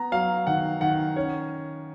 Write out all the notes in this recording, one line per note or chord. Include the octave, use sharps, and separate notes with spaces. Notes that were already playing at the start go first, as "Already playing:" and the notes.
Already playing: B3 A#5
F#3 F5
D#3 F#5
D#3 F#5
C#4 C#5